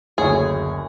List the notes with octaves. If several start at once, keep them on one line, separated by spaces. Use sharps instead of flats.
F#1 D2 G#4 C#5